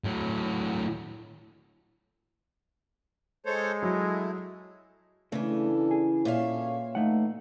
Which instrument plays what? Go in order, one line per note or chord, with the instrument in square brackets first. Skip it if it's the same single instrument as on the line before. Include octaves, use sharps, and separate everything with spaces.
[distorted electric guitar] A2 F#3
[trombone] G#3 [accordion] A4 C5 C#5
[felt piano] F#3 [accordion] A3 E4
[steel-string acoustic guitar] C#3 E3 [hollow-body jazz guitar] A3 [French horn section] D4 A4
[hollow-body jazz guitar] G#4
[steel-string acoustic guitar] A#2 E5 F5 [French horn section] C#4 A4 C#5
[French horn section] E3 D#4 [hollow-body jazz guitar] A3 F#5